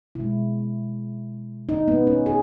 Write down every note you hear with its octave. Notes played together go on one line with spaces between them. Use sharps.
B2 G#3 E4
D#4
B3
C#4
G#4